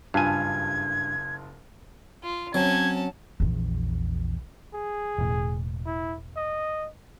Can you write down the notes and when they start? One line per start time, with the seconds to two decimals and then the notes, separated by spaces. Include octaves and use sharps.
0.14 F#1 G2 F4 G#5 A5 G#6
2.24 F4
2.54 F#3 C4 C#4 A5 G#6
3.40 A#1 E2
4.74 G#4
5.18 E1 A2
5.86 E4
6.37 D#5